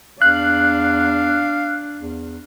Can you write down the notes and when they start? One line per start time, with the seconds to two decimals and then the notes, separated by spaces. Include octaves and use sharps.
0.22 E2 D4 F5 F#6
1.99 E2